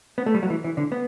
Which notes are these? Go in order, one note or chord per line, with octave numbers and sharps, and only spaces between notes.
B3
A3
G3
F#3
E3
E3
D3
B3